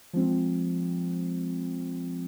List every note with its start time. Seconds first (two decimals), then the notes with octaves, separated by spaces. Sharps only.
0.13 F3 G#3 C4